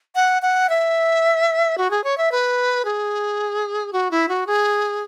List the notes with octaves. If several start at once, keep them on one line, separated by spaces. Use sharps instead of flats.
F#5
F#5
E5
F#4
G#4
C#5
E5
B4
G#4
F#4
E4
F#4
G#4